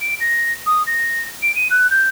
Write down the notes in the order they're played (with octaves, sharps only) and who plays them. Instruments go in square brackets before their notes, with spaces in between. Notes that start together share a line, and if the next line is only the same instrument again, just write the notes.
[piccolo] D7
A#6
D#6
A#6
D7
D#7
F#6
G6